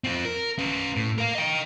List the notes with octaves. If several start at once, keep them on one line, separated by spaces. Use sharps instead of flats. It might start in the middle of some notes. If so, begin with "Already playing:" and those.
C4 F4
A#4
C#4 B4
A2
A#4 F5
D#5 G5